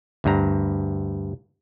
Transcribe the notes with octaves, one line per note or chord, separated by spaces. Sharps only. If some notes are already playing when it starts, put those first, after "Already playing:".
D2 G2 A#5